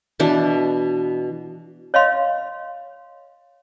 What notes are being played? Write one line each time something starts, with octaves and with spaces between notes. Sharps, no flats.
B2 E3 D4
C#5 D#5 F5 C6